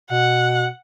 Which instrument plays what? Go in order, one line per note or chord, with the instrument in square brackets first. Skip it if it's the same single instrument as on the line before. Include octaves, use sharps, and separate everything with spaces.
[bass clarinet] B2 [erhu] F#5